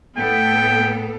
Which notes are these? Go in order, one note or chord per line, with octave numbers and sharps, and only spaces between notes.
A2 B3 A4 G5